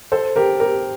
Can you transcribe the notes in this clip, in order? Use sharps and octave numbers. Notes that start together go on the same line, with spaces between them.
A4 C5
G4 A#4
G4 A#4